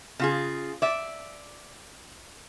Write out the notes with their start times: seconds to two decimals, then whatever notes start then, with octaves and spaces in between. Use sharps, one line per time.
0.19 C#3 F4 G#4
0.82 D5 E5